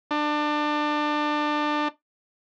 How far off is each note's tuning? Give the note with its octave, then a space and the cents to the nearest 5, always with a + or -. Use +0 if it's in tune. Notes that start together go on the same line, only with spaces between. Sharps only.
D4 +25